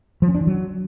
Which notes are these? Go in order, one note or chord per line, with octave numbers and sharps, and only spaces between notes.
F3
C#4
D4
E3
F#3